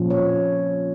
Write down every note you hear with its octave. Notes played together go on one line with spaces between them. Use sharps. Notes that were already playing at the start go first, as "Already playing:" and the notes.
Already playing: A#2 F3 C#4
C#5